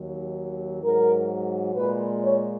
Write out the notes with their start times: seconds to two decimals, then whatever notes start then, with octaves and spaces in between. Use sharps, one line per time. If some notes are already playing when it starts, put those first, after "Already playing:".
Already playing: D#2 D#3 F#3
0.84 G#2 F#3 A#4
1.75 A#2 G#3 B4
2.22 C#5